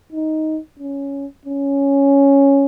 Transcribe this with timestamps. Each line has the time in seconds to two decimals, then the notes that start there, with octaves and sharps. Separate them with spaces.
0.12 D#4
0.79 C#4
1.45 C#4